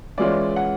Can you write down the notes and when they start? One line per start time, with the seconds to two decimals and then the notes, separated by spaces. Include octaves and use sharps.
0.18 E3 G#3 C#4 F4 D5
0.56 F#5